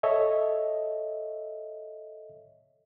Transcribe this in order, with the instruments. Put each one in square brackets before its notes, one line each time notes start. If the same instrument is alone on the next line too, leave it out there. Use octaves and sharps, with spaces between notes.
[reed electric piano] A4 C#5 D#5 E5